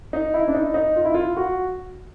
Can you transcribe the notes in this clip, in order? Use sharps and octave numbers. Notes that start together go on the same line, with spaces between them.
D#4
E4
D4
D#4
D#4
F4
E4
F4
F#4